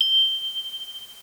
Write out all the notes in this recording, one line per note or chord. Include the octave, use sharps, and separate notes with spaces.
G7